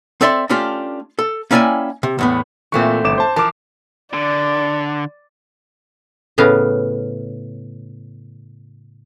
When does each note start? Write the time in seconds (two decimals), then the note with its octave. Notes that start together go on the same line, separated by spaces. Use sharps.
0.21 C4 A4 D5 E5 C6
0.49 A3 C#4 D4 F4 G4
1.19 A4
1.51 A#3 C#4 E4 D5 G5 G#5
2.03 C3
2.19 E2 A2 B3
2.72 A#2 E3 A3 C4 C#6
3.04 G1 D6 E7
3.18 C5 A5
3.36 E3 F3 A#4 A5 D6
4.14 D3 D5
6.38 A2 C#3 B3 F5